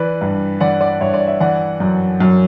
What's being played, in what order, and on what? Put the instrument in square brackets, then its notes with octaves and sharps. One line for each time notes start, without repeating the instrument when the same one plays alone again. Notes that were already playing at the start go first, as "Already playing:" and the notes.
Already playing: [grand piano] E3 B4 D5
G2
E3 D5 F#5
D5 F#5
G2 C#5 E5
D5
E5
E3 D5 F#5
F#2
F#2